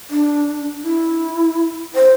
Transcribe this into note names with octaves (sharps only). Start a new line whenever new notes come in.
D4
E4
C5